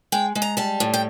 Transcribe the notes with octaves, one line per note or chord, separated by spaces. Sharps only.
G#3 G5
G#3
A#5
G3 A5
A2
G5